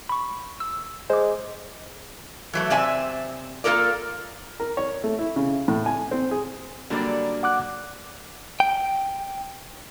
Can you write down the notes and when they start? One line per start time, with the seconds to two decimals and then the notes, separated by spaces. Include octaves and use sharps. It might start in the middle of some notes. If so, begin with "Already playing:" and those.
0.09 B5 C#6
0.60 E6
1.10 G#3 C5 D6
2.53 E3 F#3 A3
2.70 C3 C4 D5 E5 G#5
3.64 A#3 F4 A4 A#4 D5
4.60 A#4
4.77 C#5
5.04 A3
5.19 E4
5.36 C#3
5.68 A2
5.86 G#5
6.11 C4
6.31 G#4
6.90 D3 F#3 G3 A#3 D4 D5
7.43 F#5 D6 F#6
8.60 G5